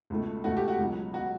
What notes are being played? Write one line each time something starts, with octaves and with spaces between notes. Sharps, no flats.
C#2 B2 A3
C#2 B2 A3 F#4
G4
F#4
C#2 B2 F#3
B2 F#3 F#4